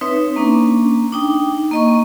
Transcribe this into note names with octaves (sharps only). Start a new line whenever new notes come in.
C4 D#4 B4 C#5 E5
A#3 C#4 D4
D4 D#4 G5
A#3 D#5 C#6